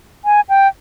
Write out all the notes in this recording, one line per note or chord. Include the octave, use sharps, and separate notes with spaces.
G#5
G5